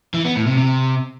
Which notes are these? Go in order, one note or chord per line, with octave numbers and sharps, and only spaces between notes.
E3
B3
A2
C3
C3